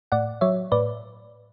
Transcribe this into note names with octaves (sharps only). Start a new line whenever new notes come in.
A2 D5 F#5
F#3 C#5 E5
A2 B4 D5